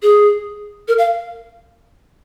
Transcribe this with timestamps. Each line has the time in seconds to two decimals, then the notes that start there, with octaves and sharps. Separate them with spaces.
0.03 G#4
0.88 A#4
0.98 F5